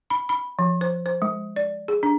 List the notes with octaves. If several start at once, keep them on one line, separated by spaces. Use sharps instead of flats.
B5
B5
F3
C5
C5
G#3
D5
G#4
D4